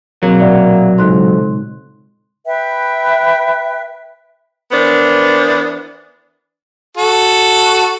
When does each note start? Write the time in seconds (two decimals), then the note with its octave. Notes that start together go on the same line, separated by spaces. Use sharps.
0.23 B2 F#3 A#3 C4 G#4
0.40 A#2 D5 E5 F#5
0.98 F2 C#3 G#3 D#4 C6 F#6
2.46 B4 E5 G5
4.71 E3 B3 D4 A#4 C5
6.97 F#4 A4